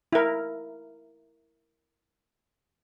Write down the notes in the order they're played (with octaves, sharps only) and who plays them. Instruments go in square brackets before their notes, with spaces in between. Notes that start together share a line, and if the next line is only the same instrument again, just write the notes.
[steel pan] E4 A#4